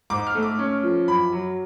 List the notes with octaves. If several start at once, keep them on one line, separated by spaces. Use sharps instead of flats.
G#2 D6
F6
A3
D6
C#4
F3
F#2 B5
F#3